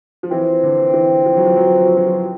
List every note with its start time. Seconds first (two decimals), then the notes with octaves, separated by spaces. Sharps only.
0.23 F3
0.31 E3 C4
0.63 D3
0.94 E3
1.26 F3
1.36 F#3
1.46 F3
1.57 F#3
1.67 F3
1.77 F#3
1.86 F3
1.97 F#3
2.07 F3